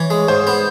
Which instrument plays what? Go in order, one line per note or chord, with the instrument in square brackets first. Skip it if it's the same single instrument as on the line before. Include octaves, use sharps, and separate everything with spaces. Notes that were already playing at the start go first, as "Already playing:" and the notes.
Already playing: [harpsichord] E3 [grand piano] C#5
[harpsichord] G#3
[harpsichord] G#2 [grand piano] C5
[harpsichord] B3